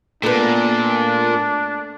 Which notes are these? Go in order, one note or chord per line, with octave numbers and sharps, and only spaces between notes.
A#2 A3 B3 D4